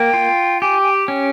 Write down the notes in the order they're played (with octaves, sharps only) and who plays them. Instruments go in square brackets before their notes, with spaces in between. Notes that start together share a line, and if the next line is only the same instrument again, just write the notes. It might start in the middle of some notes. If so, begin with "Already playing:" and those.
Already playing: [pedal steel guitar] A#3 [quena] G5
[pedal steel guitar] F4
[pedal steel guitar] G4 [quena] G#5
[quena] G#5
G5
[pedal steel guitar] C#4